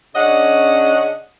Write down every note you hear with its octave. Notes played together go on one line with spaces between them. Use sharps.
C#3 C#4 D4 D#5 F#5